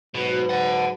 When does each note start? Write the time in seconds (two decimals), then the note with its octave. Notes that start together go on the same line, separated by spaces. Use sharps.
0.15 G#2 B2 F#3 B4
0.49 F#5 A5